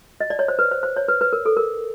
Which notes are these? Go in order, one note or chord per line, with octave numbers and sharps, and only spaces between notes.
D#5
D5
C#5
C5
B4
C5
C5
C#5
B4
B4
A#4
A4
A#4